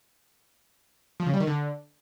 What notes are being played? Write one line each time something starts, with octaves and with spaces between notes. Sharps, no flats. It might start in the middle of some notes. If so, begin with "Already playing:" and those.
F3
C#3
G3
D#3
D3